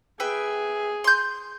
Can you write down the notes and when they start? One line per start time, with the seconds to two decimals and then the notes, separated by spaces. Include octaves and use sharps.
0.20 G#4 B4 E5 G5
1.04 C6 G6